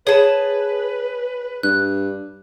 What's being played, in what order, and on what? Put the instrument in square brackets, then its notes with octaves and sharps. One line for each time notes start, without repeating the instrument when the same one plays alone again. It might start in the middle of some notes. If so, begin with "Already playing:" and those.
[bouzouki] G#4 A5 [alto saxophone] B4 [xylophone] C#5
[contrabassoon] G2 [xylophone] F#6